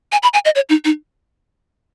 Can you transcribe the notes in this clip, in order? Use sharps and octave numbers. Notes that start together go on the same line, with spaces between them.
G#5
B5
G#5
D#5
C#5
D#4
D#4